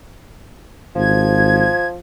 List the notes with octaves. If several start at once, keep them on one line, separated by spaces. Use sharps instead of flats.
G#1 F3 G#6